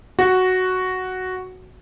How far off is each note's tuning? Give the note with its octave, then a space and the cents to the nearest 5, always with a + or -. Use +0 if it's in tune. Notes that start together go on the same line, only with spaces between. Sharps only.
F#4 +0